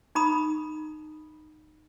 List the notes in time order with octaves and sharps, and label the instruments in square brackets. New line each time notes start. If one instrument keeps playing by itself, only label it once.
[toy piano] D#4 A#5 B5 D#6